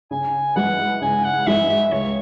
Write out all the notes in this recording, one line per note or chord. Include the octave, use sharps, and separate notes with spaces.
C#3 G#5
E3 G#3 E4 B4 F#5
C#3 G#5
F#5
E3 G#3 E4 B4 E5
E5
C#2 C#5